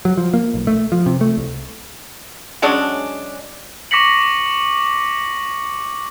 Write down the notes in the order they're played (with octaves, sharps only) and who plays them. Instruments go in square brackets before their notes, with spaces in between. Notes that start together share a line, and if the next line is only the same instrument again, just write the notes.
[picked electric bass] F#3
F3
A#3
B1
A3
F3
C3
A3
C2
[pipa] F#3 G#3 C#4 D4
[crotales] C#6 D6 A#6 B6 C#7 F#7